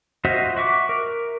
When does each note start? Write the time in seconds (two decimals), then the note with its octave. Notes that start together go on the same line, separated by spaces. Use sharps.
0.25 F4 F#4 C5 D#5 E5
0.56 F#4 E5 C#6 D6
0.89 A#4